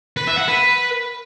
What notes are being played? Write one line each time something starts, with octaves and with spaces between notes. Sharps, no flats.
B4
E5
F#5
B4